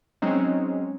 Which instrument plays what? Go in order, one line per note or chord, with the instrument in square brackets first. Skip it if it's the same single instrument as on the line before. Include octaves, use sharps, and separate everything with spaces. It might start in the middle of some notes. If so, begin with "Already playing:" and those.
[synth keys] F#3 G#3 C4 C#4 D#4